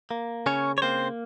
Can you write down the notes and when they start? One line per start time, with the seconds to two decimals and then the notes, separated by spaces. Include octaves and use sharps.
0.11 A#3
0.46 C#3 C#4 C#5
0.78 C#5
0.82 A#3 C4 C5